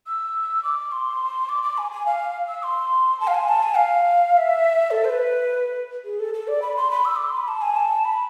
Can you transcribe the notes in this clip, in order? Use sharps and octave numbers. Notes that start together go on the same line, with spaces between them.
E6
D6
C6
D6
D6
G#5
G#5
F5
E6
C6
A5
F5
G#5
A5
G#5
F5
F5
E5
A4
C5
B4
G#4
A4
A4
D5
B5
C6
B5
E6
D6
C6
B5
A5
G#5
A5
B5